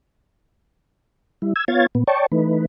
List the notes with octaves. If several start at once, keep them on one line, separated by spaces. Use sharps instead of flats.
G3 E4
E6 G#6
B3 F4 C#5 F5 G#6 A6
A#2 B3
C#5 D5 G5 A5 C#6
E3 A3 D#4 B4